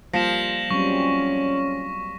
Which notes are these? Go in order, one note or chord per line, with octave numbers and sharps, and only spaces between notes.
F3 G3 A#3 F4 A#6 B6 E7
F#3 G3 C4 C#4 C#6